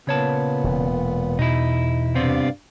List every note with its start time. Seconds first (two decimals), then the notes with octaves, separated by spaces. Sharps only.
0.07 A#2 C#3 B3 C#5 A5
0.64 E1
1.39 E2 B2 D#4 E4
2.15 G2 C3 B3 C4 D5 F5